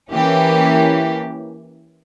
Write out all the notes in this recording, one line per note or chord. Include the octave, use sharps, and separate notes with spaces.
E3 A#3 C#4 G4